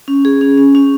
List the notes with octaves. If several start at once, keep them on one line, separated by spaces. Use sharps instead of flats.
C#4
G#4
C#4
C#4
C#4